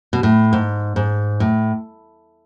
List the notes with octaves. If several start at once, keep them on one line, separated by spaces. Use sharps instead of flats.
B2
A2
G#2
G#2
A2